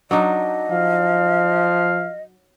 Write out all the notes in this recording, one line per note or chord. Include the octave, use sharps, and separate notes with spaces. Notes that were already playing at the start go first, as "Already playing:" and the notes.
F#3 D4 D#4 D#5
F3 F5